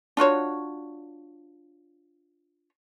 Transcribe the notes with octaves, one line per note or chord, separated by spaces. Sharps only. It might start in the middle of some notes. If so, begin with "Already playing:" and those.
D4 F4 F#4 C#5